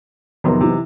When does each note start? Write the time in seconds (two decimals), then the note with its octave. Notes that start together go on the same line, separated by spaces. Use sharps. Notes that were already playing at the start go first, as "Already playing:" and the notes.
0.44 F2 C3 D#3 F#3 B3 A#4 C6
0.61 C3 E3 D#4